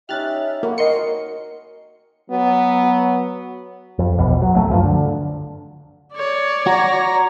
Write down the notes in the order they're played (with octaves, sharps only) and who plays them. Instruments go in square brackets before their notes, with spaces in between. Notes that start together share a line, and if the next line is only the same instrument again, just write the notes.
[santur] C#4 D#4 G4 [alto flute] E5 [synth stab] F6 F#6 A6
[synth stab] A#3 [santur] F#4 B5
[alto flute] A#4 [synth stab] D#5 C6 C#7
[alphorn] F#3 [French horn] B3
[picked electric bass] F2
A#1 E2 B2
F#3
D1 C2 F#3 A3
F#1 G2 F3
D3
[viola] C#5 D5
[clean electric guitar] F#4 [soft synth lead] A#5